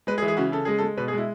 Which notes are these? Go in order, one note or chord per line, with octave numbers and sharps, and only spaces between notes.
G#3 B4
G#4
E3
G#4
C#3 F#4
C#3 A4
G#3 G#4
A4
G#3
B2 B4
G#4
G#3 E4